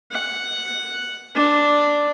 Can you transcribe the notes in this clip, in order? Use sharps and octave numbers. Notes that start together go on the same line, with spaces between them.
F#5
D4